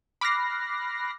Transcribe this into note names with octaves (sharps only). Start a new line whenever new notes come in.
B5 D6 F6 F#6 A#6 C7